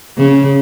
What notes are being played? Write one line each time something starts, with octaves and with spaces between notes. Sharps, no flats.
C#3